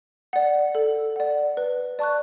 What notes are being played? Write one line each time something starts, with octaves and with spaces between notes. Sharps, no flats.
D5 F#5
A4
D5 F#5
B4
D5 A5 C#6 F#6